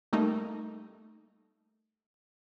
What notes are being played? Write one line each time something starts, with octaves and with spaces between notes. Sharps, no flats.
G3 A3 A#3 D#4